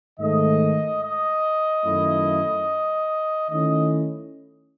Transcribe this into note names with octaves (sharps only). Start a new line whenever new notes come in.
G#2 D#3 A3 D#5
D#5
F#2 D#3 A3 E4
D#3 A3 C#4 E4 D#5